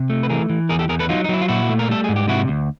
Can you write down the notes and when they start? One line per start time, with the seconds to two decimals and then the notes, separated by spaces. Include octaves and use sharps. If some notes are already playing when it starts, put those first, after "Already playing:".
Already playing: C3
0.10 A3
0.23 B4
0.29 E3 G#4 A#4
0.50 E3
0.69 E2 G#4 A#4
0.79 G4 A4
0.89 E2 G#4 A#4
0.99 A4 B4
1.09 F#3 D#4 F4
1.24 D#4
1.29 F#3 E4
1.41 F4
1.48 A#2 E4 F#4
1.69 A3
1.79 A#4
1.89 G3 A4
2.04 G#2 G#4
2.16 G4
2.28 C3 E4 F#4
2.48 D2